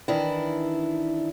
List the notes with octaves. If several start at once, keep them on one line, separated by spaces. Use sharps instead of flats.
D#3 E3 D4 E4